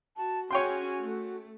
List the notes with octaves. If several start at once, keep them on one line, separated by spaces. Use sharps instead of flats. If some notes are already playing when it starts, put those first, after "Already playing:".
F#4 A5
C#4 F#4 G#4 C#5 G5 G#5 C6
A3